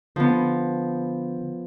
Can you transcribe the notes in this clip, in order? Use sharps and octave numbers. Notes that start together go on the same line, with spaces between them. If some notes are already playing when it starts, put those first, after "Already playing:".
D3 F3 B3